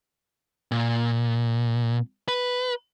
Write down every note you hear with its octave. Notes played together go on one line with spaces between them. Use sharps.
A#2
B4